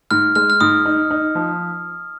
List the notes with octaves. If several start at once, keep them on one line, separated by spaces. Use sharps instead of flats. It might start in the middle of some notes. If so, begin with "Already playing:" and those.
G#2 F6
G#3 F6
F6
G#2 D#6
D#4
D#4
F3